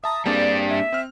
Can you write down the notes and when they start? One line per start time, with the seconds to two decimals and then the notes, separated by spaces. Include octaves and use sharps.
0.04 E5 A5 A#5 D#6
0.26 G3 A#3 C4 D4 G#4 D5
0.69 E5
0.93 C4 F6